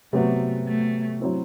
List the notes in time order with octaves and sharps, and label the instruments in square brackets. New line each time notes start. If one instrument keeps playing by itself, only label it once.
[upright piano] C3 F#3 B3 F#4 B4 [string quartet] A3
[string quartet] A3
[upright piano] F#3 C4 E4